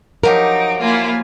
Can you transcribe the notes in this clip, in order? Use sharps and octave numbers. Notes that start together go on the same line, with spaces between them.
F3 F#3 D#4 G4 A#4 D7
A#3 E4 F4 G#5